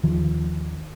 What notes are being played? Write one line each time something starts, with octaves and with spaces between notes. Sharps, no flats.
D#2 D#3 F3